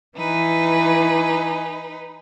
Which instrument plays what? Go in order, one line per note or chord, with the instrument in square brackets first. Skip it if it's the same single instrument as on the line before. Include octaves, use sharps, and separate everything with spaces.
[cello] E3 [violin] D#4 B4 [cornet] G#5